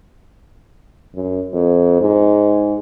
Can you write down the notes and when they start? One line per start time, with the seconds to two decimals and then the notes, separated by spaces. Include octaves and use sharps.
1.15 F#2
1.53 F2
2.01 G#2